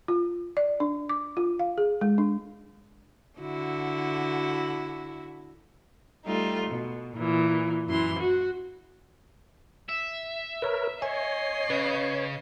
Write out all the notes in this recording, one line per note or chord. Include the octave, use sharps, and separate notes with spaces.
F4
D5
D4
D6
F4
F5
G#4
G#3
D4
D3 E4 F#4
G3 A3 D#4 F4
B2
A#2 E3
F#2 E3 C6
F#4
E5
A#4 B4 C#5
C#5 D#5 G#5 C7
C#3 B4